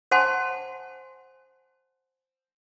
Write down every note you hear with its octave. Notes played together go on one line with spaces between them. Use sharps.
C5 F#5 G#5 A5 C6